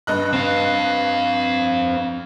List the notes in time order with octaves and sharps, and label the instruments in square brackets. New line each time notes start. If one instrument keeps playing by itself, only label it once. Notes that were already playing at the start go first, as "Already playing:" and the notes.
[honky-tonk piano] G2 D#5 F#6
[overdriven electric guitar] C4 F5